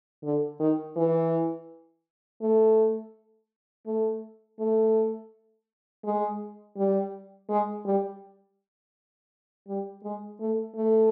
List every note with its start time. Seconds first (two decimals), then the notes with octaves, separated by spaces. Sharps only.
0.24 D3
0.60 D#3
0.96 E3
2.42 A3
3.86 A3
4.59 A3
6.04 G#3
6.77 G3
7.50 G#3
7.85 G3
9.68 G3
10.04 G#3
10.40 A3
10.76 A3